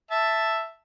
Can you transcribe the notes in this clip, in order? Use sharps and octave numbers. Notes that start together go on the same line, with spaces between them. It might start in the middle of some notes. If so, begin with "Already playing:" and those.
E5 A5